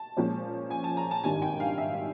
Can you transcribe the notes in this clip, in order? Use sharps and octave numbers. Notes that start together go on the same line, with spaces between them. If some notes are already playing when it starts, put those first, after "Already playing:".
Already playing: A5
A#2 F3 G#3 C#4
G#5
A5
A#5
A5
G#1 G2 D#3 G3 G#5
G5
F5
E5